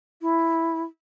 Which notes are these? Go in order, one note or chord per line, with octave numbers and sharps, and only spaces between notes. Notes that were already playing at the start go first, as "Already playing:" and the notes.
E4